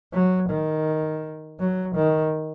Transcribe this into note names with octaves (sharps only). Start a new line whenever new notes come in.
F#3
D#3
F#3
D#3